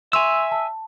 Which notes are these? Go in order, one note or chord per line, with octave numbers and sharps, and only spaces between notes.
E5 G#5 C6 C#6 E6 F7
A5